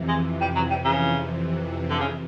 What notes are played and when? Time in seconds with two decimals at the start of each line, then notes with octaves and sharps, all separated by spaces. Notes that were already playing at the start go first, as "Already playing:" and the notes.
Already playing: F2 C3 E3
0.08 G#3
0.41 G3
0.56 F#3
0.70 G3
0.84 C#3
1.90 D3
2.00 C#3